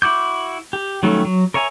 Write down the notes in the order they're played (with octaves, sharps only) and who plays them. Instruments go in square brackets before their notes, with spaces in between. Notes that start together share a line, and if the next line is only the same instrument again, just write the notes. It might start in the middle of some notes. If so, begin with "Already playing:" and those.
[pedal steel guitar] E4 F#4 D6 G6
G4
D#3 F#3 G3 A3 C#4
F#3
A#4 C#5 E5 G#5 A#5